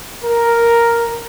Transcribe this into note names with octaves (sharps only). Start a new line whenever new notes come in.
A#4